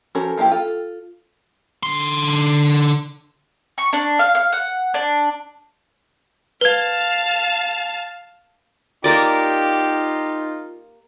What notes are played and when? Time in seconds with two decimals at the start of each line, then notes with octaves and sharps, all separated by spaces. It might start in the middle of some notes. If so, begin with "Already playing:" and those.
0.15 F3 C#4 F#4 A4 A#4
0.38 F3 A#3 E4 G4
0.51 F4 A4
1.83 D3 C6
3.78 C#6
3.93 D4
4.19 F5
4.35 F5
4.52 F#5
4.94 D4
6.61 B4 F5 A5 G#6
9.04 A#3 D#4 F4 G4 A#4 D5